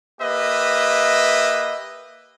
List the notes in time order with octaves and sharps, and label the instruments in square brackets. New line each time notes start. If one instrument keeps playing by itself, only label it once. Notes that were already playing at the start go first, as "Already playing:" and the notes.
[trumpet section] A#3 G4 B4 D#5 E5